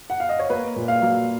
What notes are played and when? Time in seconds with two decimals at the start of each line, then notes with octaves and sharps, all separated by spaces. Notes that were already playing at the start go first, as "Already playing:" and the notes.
0.10 F#5
0.20 F5
0.29 D#5
0.39 C#5
0.50 A#3 B4
0.76 A#2
0.88 F5
1.02 F#3